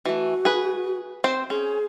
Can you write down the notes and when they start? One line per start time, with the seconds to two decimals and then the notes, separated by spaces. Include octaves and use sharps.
0.05 E3 A3 F#4
0.45 G#4 B4
1.24 C4 C5
1.50 C#4 G#4